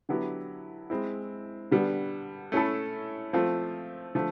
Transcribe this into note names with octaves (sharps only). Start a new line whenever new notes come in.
D3 F#3 B3 E4 G4
G#3 C4 E4
D3 G3 B3
A3 C#4 E4 A4
F3 A3 C4 F4
D3 F3 A3